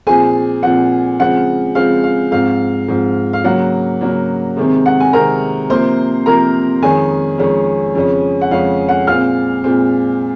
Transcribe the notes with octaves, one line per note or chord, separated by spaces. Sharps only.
A#2 F3 C4 G#4 G#5
A#2 F3 C4 F#5
C#3 F3 G#3 C4 F#5
C#3 F3 G#3 C4 F5
F5
G#2 F3 C4 F5
G#2 F3 C4
F5
C#3 F#3 A#3 F#5
C#3 F#3 A#3
C3 D#3 G#3 C4
F#5
G#5
C3 D#3 G#3 C4 A#4 A#5
C3 F3 A#3 C5 C6
C3 F3 A#3 A#4 A#5
F2 D#3 G#3 C#4 G#4 G#5
F2 D#3 G#3 C#4
F2 C#3 G#3 C#4
F#5
F2 C#3 G#3 C#4 F5
F#5
A#2 G#3 C4 F5 F6
A#2 G#3 C4